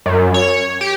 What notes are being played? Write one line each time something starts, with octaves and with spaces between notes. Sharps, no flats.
F#2
C#5
G4